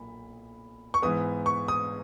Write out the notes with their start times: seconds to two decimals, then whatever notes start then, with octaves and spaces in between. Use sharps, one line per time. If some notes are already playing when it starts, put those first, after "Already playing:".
Already playing: B1 A#2 A#3 B5
0.94 C#6
1.02 G#2 E3 B3 D#6
1.46 C#6
1.68 D#6